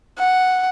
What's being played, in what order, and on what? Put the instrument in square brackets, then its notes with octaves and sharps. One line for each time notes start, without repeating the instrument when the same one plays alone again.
[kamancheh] F#5